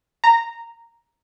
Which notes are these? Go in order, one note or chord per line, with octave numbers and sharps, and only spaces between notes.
A#5